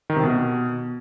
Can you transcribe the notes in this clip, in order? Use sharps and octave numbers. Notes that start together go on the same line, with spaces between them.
D#3
C3
B2